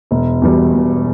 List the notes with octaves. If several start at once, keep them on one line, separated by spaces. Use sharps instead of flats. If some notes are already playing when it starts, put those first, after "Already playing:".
E1
E2 B2 G3
E1